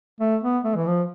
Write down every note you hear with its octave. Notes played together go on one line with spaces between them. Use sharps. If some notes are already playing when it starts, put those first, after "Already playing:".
A3
B3
A3
E3
F3